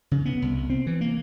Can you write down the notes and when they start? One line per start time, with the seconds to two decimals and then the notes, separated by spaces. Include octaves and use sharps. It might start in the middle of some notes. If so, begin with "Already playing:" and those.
0.11 C#3
0.26 B3
0.42 C2
0.70 C4
0.87 E3
1.01 A#3